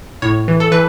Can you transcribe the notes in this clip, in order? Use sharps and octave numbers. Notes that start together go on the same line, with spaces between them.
A2 C#5
E3
A4
E3 B4